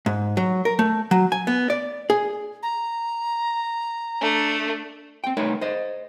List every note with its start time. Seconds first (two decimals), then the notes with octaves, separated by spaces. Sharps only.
0.06 G#2
0.37 F#3
0.65 A#4
0.79 A3
1.11 F#3
1.32 G#5
1.47 B3
1.70 D5
2.10 G#4
2.63 A#5
4.21 A3 D4
5.24 C4 G5
5.37 C2 A3 D#4 A#4 B4 C#5
5.61 C5 D#5